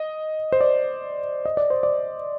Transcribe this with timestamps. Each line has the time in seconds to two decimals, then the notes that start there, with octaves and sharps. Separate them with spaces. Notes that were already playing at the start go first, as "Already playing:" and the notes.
Already playing: D#5
0.52 C5
0.61 D5
1.46 D#5
1.57 D5
1.70 C5
1.83 D5